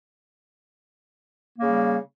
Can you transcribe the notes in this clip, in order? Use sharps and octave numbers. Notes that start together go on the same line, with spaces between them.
C#3 G3 A#3